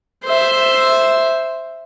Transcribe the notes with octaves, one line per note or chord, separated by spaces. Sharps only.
C5 E5